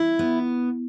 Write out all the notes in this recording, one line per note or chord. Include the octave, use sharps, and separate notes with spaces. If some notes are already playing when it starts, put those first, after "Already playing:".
Already playing: E4
B3